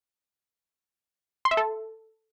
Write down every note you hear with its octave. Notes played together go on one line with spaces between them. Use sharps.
C6
E5
A4